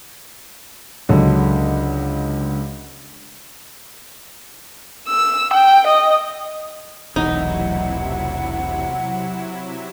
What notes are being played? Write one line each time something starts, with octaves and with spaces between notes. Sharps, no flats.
C#2 D3 F#3
E6
G5
D#5
E1 B1 E2 C3 F#3 D#4 E4 F#5